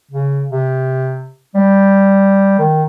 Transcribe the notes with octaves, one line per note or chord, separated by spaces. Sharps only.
C#3
C3
G3
D#3